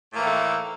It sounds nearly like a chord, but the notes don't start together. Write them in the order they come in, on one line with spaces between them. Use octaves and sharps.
A2 A#3 E3 D#3 A3